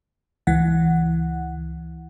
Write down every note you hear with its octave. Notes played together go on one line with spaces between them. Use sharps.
C#2 E3 F#5